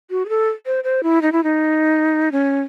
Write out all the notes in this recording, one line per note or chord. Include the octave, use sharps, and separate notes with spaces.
F#4
G#4
A4
C5
C5
E4
D#4
E4
D#4
C#4